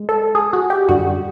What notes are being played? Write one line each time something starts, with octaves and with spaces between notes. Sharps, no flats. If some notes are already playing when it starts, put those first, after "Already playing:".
Already playing: G#3
A4
G#4
F#4
G4
F#2 D3 G3 F#4